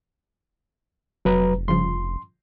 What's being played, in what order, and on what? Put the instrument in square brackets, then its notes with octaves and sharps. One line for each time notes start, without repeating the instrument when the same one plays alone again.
[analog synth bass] F1 [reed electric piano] F#3 B4 A#5
[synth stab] G2 C#3 F3 [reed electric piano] C6